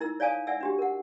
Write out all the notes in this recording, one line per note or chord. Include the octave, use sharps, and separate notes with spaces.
D#4 E4 A#4 E6
C#5 D5 F5 G#5 A5 D#6
D5 E5 F#5 G#5 E6
D4 F#4 G4
A#4 F#5